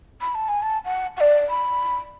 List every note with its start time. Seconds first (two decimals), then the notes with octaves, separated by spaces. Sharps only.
0.21 B5
0.34 A5
0.48 G#5
0.62 A5
0.84 F#5
1.16 F#5
1.20 D5
1.49 B5